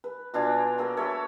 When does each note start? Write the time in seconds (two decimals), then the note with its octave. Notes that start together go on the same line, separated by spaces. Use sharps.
0.04 B4
0.34 B2 D4 F4 G#5
0.78 F#3 A#3 A4
0.97 A4 C#5 E5 B5